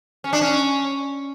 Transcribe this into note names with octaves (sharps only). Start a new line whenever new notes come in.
C#4
D4
C#4